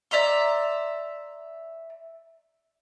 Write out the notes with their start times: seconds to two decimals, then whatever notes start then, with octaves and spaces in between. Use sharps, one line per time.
0.11 D5 E5 A#5 C6